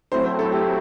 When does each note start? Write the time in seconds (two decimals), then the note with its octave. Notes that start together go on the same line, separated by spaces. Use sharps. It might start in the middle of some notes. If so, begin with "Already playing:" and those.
0.12 F#3 A3 C4 E4 C5
0.25 C5
0.39 A4
0.52 G4